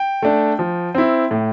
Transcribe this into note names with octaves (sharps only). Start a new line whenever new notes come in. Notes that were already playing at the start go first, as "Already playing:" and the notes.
Already playing: G5
A3 D4
F3
C4 E4
A2